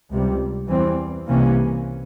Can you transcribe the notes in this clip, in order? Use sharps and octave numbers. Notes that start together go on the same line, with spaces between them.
C#2 C3 G3
E2 E3 G3 C4
C2 C3 E3 A#3 C#4